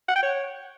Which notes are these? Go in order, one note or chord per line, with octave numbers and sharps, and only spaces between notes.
F#5
G5
C#5